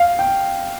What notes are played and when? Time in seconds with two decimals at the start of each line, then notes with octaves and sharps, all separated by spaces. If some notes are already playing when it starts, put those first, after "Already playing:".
Already playing: F5
0.19 G5